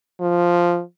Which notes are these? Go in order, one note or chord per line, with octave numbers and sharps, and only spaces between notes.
F3